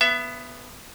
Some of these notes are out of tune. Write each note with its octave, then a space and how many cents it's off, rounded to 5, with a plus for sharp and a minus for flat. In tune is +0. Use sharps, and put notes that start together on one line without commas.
B3 +0 E5 +25